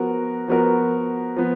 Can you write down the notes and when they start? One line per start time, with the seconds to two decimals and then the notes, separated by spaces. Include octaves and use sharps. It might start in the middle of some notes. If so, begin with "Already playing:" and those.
Already playing: F3 B3 F#4 A#4
0.48 F3 B3 F#4 A#4
1.37 F3 B3